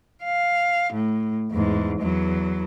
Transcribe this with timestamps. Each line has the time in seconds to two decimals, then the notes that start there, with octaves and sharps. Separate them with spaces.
0.24 F5
0.93 A2
1.51 E2 G#2
2.01 E2 F#3